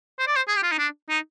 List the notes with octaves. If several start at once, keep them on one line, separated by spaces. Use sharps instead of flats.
C5
D5
C5
G#4
G4
F4
D#4
D4
D#4